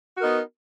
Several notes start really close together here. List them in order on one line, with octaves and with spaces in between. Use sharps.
F#4 A#4 D#4 B3